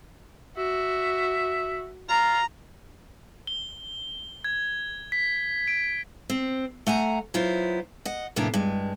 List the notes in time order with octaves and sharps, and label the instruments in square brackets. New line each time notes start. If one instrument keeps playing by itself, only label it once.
[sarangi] F#4 [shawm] E5
[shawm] F4 [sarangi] A#5
[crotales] G7
G#6
B6
D7
[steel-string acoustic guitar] C4
A3 F#5 G#5 A#5
F#3 B3 E4 F4 C5
D#5 F#5
F2 A2 C3 A#3 B3 D4
G2 G#3